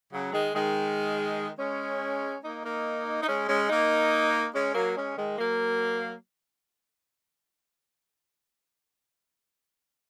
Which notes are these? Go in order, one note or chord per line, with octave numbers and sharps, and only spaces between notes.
C#3 F#3
D#3 G#3
D#3 G#3
G#3 C#4
A#3 D#4
A#3 D#4
D#4
G#3 C#4
G#3 C#4
A#3 D#4
G#3 C#4
F#3 A#3
G#3 C#4
D#3 G#3
F#3 A#3